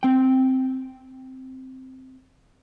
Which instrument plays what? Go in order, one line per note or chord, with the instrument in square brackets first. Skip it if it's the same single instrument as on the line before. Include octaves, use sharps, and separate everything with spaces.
[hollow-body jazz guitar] C4 G5